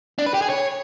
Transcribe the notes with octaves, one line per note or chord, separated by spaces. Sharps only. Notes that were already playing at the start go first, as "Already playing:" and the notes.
D4
B4
G4
G#4
C#5